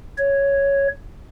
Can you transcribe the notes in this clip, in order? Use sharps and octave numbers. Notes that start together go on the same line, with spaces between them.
C#5